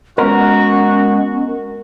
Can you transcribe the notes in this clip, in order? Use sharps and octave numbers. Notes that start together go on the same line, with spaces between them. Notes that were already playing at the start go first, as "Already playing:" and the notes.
G#3 B3 C#4 F#4 A#4